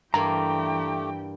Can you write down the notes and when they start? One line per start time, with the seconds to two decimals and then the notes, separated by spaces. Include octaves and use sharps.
0.14 G2 E3 A3 A#3 G4 G5 A#5